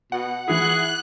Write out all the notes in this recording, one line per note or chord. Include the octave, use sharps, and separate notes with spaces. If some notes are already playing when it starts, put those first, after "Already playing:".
B2 F#5
E3 E4 G#4 F#6